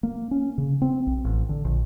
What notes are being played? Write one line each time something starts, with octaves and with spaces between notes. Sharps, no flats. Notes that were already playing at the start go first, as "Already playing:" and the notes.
A#3
C#4
C#3
C4
B1
A1
D3
A#1